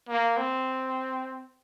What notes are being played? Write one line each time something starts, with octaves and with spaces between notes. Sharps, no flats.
A#3
C4